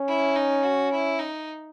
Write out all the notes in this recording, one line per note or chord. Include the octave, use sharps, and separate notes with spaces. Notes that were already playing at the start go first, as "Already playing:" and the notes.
Already playing: C#4
E4
D#4
F#4
E4
D#4